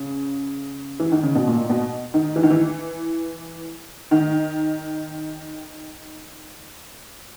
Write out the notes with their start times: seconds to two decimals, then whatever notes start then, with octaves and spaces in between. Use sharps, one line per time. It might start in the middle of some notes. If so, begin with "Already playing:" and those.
Already playing: C#3
1.00 E3
1.12 D#3
1.23 C#3
1.35 B2
1.48 A#2
1.70 B2
2.14 D#3
2.36 E3
2.43 D#3
2.50 E3
4.11 D#3